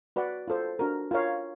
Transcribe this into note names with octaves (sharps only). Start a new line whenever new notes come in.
F#4 B4 D5 F#5
F4 A4 C5
D4 F#4 A#4
F4 A#4 C#5 F5